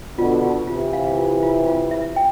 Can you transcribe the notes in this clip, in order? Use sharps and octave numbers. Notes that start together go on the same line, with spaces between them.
B2 D3 F4
F4
C3 E3 F4
F5
F4
F4
F4
E5
G5